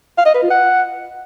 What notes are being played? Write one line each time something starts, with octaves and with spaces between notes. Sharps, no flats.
F5
D#5
B4
F4
F#5